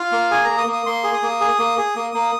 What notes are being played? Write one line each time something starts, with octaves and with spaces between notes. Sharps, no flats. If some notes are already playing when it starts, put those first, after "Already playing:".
Already playing: F4 F5
A#3
G#4 G#5
A#3 A#5
D#6
A#3
D#6
A#3 C6
G#4
D#6
A#3
G#4
A#3
G#4
A#3
A#3